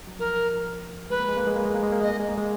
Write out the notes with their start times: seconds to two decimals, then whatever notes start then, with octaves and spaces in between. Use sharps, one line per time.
0.07 F#3
0.19 F3 A#4
1.10 G#3 B4
1.20 A#3
1.29 G#3
1.37 A#3
1.47 G#3
1.56 A#3
1.65 G#3
1.75 A#3
1.83 G#3
1.92 A#3
2.01 G#3 D#5
2.11 A#3
2.20 G#3
2.29 A#3
2.37 G#3